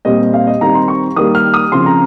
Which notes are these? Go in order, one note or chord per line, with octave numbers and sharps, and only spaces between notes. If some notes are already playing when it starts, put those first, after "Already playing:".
A#2 G3 C4 D#5
F5
D#5
D#3 G3 C4 A#5
C6
C#6
D#3 G3 A#3 D#6
F6
D#6
C#3 F3 C4 C6
A#5